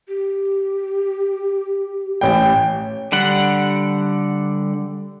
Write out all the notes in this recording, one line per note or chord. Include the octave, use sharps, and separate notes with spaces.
G4
A1 G5
D3 G3 F#5